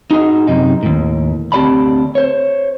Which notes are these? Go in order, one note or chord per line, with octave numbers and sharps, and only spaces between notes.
D#4 F#4 G#4 D#5
F#2 C3 D#4
D#2 A2
D2 C4 G4 D5 A5 B5
C5 C#5